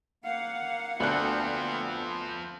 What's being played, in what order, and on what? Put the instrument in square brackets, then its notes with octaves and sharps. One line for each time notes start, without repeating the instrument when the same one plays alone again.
[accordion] A#3 F#5 [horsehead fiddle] F5
[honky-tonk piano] D2 D4 F#6 [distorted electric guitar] F3 C4 [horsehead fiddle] B3